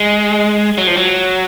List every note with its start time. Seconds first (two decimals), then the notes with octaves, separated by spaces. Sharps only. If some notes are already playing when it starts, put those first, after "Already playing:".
Already playing: G#3
0.78 F#3
0.87 F3
0.97 F#3